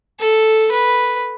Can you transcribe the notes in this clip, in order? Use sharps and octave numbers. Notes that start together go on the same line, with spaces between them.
A4
B4